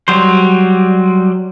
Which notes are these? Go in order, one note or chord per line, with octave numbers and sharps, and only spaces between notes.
F#3 G3 C5